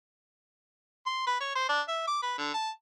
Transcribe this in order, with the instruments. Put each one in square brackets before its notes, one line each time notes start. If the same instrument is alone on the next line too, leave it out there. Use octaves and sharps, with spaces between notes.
[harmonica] C6
B4
C#5
C5
D4
E5
D6
B4
D3
A5